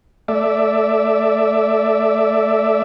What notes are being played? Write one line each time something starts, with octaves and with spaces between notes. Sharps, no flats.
A3 D5 E5